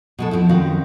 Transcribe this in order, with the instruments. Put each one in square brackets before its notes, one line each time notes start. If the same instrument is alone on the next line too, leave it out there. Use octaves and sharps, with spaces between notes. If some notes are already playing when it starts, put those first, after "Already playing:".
[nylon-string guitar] B2 G#3 A4
F3 F#3 C4 E4
F#2 D#3 C4 F#4 F5